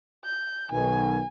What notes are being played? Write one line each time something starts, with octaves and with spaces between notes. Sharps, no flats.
G6
B1 B2 D#3 G#5